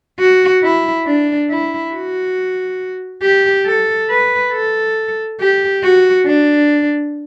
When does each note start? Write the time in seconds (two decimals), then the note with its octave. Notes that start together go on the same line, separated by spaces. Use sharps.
0.20 F#4
0.63 E4
1.06 D4
1.50 E4
1.93 F#4
3.23 G4
3.66 A4
4.10 B4
4.53 A4
5.40 G4
5.83 F#4
6.26 D4